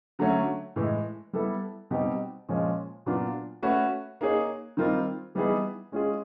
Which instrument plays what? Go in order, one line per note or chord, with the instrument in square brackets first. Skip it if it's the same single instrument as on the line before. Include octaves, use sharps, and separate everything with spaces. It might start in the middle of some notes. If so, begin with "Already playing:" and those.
[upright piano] D3 F#3 A3 C#4
A2 E3 G#3
G3 B3 E4 A4
B2 G3 C4 D#4 G4
A#2 F3 G#3 C#4
A#2 F#3 B3 D4 F4
A3 C#4 F#4 B4
A#3 D#4 G#4 C#5
D#3 G3 C4 F4 A#4
E3 G3 B3 D#4 G#4
G#3 C#4 F4 G#4